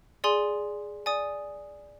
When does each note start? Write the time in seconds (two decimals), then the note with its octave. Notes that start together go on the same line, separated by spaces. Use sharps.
0.24 G#4 D5 G#5 C6
1.06 D5 G#5 D#6